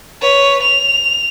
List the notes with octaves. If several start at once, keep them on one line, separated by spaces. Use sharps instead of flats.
B4 C#5
F7